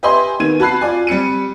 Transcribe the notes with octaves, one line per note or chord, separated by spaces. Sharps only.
G4 B4 D#5 E5 G#5 C6
D#3 B3 G#6 D#7
F#4 A5 B5 F#6 C7
F4 D5 G#5
G3 C4 C#7 D#7